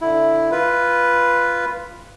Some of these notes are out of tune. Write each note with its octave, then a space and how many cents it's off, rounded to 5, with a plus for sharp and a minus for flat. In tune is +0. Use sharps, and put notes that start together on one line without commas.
D3 +0 E4 +0
F4 -10 B4 +0